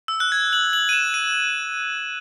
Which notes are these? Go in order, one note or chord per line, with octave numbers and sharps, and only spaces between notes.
E6
F#6
G#6
F#7
F#7
D#7
E7
D#7